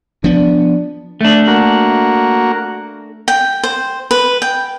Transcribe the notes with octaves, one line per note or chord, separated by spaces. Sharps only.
F3 B3 D4
A3 D4
A#3 F#4
G5
C5
B4
G5